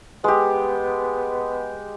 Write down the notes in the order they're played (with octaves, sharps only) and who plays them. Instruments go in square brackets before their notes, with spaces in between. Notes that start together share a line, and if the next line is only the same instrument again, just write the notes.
[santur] G#3 G4 [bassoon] B3